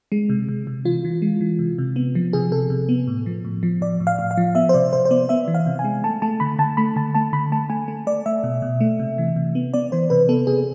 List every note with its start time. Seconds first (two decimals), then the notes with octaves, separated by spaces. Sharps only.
0.12 G#3
0.29 C3
0.49 C3
0.67 C3
0.85 E3 F4
1.05 E3
1.22 G#3
1.41 E3
1.59 C3
1.78 C3
1.96 B3
2.15 F3
2.33 C3 G#4
2.52 C3 A4
2.70 C3
2.89 B3
3.07 A2
3.26 F3
3.45 A2
3.63 F3
3.81 A2 D5
4.00 A2
4.07 F5
4.19 A2
4.31 F5
4.37 F3
4.55 B3 E5
4.69 C5
4.74 C3 D5
4.93 C3 C5
5.05 C5
5.11 B3 D5
5.29 B3 E5
5.48 E3
5.55 F5
5.66 C3
5.79 G#5
5.84 G#3
6.04 A3 A5
6.22 A3 A5
6.40 D3 B5
6.59 D3 A5
6.77 A3 B5
6.96 D3 A5
7.15 A3 A5
7.33 D3 B5
7.52 A3 A5
7.70 A3 G#5
7.88 A3
8.07 A3 D5
8.26 A3 E5
8.44 B2
8.62 B2
8.80 A3
8.99 C3
9.18 E3
9.36 C3
9.55 B3
9.74 B3 D5
9.92 E3 C5
10.10 C3 B4
10.29 B3 A4
10.47 C3 G#4